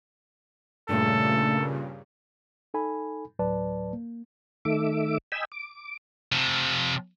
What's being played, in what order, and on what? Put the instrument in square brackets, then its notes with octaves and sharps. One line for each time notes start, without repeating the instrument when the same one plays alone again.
[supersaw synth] G2 A#2 C#3 [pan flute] A3 [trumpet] A4
[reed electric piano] D#4 A4 G#5 B5
D2 A2 F#3 B4 D5 A5
A#3
[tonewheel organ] D#3 A3 E5 D6
D#5 G5 G#5 B5 E6
D6
[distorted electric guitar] C3 F3